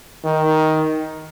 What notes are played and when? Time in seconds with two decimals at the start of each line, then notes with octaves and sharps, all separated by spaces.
0.25 D#3